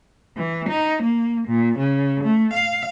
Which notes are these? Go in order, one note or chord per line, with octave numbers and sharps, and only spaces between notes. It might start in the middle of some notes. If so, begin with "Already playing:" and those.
E3
D#4
A#3
A#2
C#3
A3
F5